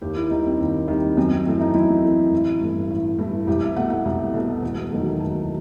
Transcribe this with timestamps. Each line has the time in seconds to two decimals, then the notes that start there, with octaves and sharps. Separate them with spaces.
0.01 D#2 G4
0.16 E4
0.30 D#3 G3 D#4
0.46 C4
0.59 D#2
0.88 D#3 G3
1.17 F#2 C4
1.32 C4
1.46 E3 A3 C4
1.60 D#4
1.74 F#2 E4
2.04 E3 A3
2.32 A1
2.61 G2 E3 A3
2.90 A1
3.18 G2 E3 A3
3.47 C2 G4
3.62 E5
3.76 B2 A3 F#5
3.90 F#5
4.05 C2
4.34 B2 A3
4.62 E1
4.91 D#2 D#3 F#3 A3
5.20 E1 A5